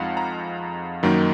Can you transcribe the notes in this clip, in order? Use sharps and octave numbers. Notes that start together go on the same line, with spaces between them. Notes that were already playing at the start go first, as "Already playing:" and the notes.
Already playing: F2 F3 G#3 D#4 F5 F#5
A#5
F#2 D#3 F#3 A#3 D#4